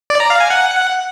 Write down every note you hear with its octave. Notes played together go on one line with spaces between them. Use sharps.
D5
A#5
F5
G#5
F#5